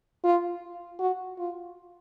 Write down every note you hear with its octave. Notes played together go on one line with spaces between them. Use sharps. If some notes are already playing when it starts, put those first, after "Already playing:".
F4
F#4
F4